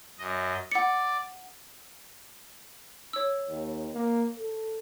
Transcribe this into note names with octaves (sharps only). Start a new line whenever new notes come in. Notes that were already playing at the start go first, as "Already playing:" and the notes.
F#2 D#5
D5 F#5 C#7
C#5 E6
D#2
A#3
A4